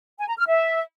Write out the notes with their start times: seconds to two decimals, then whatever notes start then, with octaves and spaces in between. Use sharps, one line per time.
0.18 G#5
0.28 A#5
0.38 F6
0.47 E5